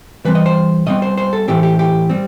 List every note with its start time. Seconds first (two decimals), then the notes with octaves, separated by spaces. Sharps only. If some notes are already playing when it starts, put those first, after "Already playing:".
0.25 E3 G3 C4 B4
0.35 D#5
0.46 C5
0.86 B2 G3 C4 D#5
1.02 C5
1.18 C5
1.33 A4
1.48 A2 E3 A3 C4 G4
1.63 G4
1.79 G4
2.10 G3 C4